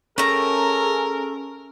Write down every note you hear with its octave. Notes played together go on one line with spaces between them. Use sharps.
A3 C#4 G#4 A#4 E5 G5 A#5